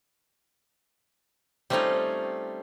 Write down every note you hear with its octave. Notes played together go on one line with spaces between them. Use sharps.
G3 A3 C4 C#4 D#4 F4